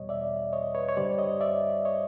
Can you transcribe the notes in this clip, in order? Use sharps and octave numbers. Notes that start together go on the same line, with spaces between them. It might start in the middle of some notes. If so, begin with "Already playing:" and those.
Already playing: E2 B2 G3 C#5 D#5
D5 E5
C#5 D#5
B4 C#5
C#5
G2 D3 G3 C5 D5
C#5 D#5
D5 E5
C#5 D#5